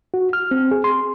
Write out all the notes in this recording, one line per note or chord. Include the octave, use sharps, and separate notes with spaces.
F#4
F6
C4
G#4
C6